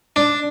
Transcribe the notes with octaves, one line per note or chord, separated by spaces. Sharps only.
D4